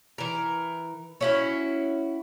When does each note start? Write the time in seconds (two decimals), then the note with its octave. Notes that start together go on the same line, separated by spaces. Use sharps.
0.18 E3 A#4
1.21 C#4 E4 F#4